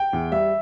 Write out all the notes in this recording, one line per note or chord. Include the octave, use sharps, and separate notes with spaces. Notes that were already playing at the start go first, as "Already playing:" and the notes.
Already playing: G5
E2
G3 E5